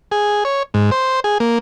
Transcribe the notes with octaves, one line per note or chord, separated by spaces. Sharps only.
G#4
C#5
G#2
C5
G#4
A#3